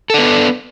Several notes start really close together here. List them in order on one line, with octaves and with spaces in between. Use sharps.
A4 D4 B3